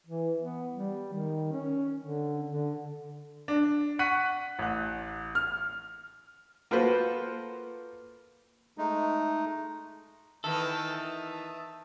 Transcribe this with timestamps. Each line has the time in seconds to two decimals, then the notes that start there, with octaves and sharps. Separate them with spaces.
0.07 E3
0.40 B3
0.74 G3
1.13 D#3
1.52 C#4
2.00 D3
2.48 D3
3.48 D4
3.99 F#5 C#6 F#6 B6 D#7
4.59 A1 F#6
5.35 F6
6.71 A#3 F4 F#4 A4 B4 C5
8.78 G#3 A3 D#4
10.44 D#3 E3 B3 A4 E5 A5 D#6